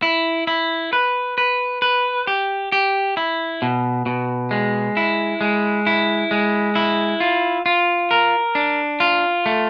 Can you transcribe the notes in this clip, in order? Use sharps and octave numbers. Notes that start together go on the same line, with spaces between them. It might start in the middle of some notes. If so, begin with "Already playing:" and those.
E4
E4
B4
B4
B4
G4
G4
E4
B2
B2
G#3
E4
G#3
E4
G#3
E4
F4
F4
A#4
D4
F4
A3